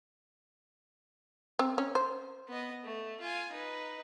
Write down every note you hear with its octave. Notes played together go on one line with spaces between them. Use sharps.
C4
C#4
C5
B3 D#5
A3
F4 G#5
D#4 B4